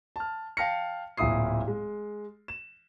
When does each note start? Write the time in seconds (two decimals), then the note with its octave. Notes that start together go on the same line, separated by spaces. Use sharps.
0.16 A5 F6
0.57 F5 G5 A5 F6 A#6 C#7
1.17 D1 A#2 A#3 E4 D#6 C7
1.68 G#3
2.48 E7